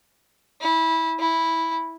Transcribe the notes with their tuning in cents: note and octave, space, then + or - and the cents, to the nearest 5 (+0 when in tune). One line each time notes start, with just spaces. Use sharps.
E4 -20
E4 -10